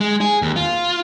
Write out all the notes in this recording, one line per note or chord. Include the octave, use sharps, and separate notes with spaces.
G#3
G#4
D#2
F4